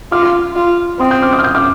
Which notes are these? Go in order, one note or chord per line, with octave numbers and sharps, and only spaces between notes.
F4 D6 F6
F4
C4 C6 D#6
D#6 G6
D6 F6
D#6 G6
F6
D#6 G6
D6 F6